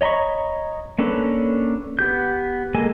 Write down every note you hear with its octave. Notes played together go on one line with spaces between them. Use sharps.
C#5 D#5 A#5 B5 C#6
A#3 C#4 D4 A4 B4
B3 G4 G6
G#3 A#3 A4 G#5